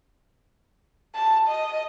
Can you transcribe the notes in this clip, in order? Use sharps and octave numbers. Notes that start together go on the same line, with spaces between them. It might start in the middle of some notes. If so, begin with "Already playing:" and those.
A5
D#5